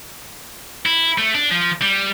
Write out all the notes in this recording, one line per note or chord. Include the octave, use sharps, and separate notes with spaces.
E4
A3
D4
F3
G3